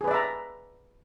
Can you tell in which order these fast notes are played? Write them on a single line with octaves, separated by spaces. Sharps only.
G#4 B4 D5 E5 A#5